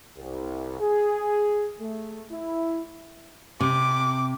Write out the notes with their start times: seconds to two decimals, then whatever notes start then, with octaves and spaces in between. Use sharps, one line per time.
0.18 C2
0.81 G#4
1.80 A3
2.32 E4
3.61 C3 D6